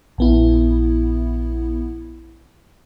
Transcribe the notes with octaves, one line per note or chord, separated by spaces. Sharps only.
A#1 B3 E4